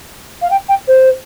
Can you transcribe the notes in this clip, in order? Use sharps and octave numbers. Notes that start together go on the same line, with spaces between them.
F5
G5
G5
C5